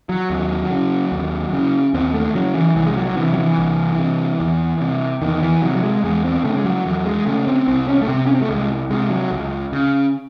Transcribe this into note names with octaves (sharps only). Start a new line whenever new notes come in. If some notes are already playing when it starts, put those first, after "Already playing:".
F#3
D#2
C#3
D#2
C#3
D#2 C4
A3
C#3 F#3
E3
C2 E3
G#3
F#3
C3 E3
F#3
E3
C2
C3
E2
C3
E2 D#3
E3
C3 F#3
F#3
G#3
E2 G#3
C4
C#3 A3
G#3
F#3
E2 F#3
G#3
C#3 A3
C4
C2 C4
C#4
A3
C3 C4
C#4
C4
A3
C2 G#3
C3 G#3
F#3
C#2
C#3